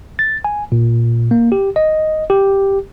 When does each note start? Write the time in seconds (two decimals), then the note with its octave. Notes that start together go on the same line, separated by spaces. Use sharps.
0.19 A6
0.45 G#5
0.72 A#2
1.31 A#3
1.52 G4
1.76 D#5
2.30 G4